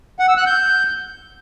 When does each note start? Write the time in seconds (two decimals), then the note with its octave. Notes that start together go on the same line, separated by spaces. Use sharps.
0.19 F#5
0.28 E6
0.37 F#6
0.46 G6